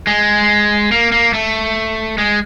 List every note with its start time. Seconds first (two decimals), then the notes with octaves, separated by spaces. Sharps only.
0.07 G#3
0.92 A#3
1.12 A#3
1.33 A3
2.18 G#3